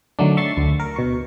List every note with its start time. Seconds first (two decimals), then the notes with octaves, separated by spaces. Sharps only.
0.19 D3 D#3 F#3 A3 D4
0.37 E5 C#6 A6 C7
0.57 D2
0.80 A#4
0.96 B2 C#6